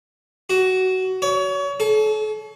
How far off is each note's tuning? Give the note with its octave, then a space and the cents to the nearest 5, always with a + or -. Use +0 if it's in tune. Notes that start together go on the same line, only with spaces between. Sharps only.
F#4 +15
C#5 +30
A4 -40